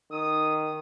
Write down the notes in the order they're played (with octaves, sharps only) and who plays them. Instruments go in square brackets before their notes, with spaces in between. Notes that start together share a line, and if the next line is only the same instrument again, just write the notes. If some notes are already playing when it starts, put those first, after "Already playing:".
[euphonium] D#3 [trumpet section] D#6